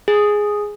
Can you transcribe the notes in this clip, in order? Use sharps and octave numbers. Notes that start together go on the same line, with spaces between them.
G#4